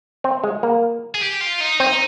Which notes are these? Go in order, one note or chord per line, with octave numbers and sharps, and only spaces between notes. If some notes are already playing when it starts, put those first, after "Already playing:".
C4
G#3
A#3
G#4
G4
F4
D#4
C4 D#4